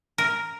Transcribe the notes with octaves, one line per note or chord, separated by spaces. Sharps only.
A#4